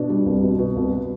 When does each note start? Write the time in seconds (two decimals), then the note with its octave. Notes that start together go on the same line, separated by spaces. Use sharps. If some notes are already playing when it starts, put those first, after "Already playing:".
Already playing: B2 D4
0.10 G3
0.26 C2
0.43 B2
0.58 B2
0.76 C2